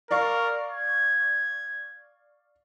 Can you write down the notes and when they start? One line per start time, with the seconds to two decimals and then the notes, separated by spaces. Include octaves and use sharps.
0.11 A#4 D5 F5 C#6
0.72 G#6